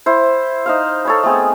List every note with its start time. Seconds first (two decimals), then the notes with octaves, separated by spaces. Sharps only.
0.06 E4 C5
0.66 D#4 C5 F5
1.05 A4 C#5 B5
1.23 A3 B3 C4 G#4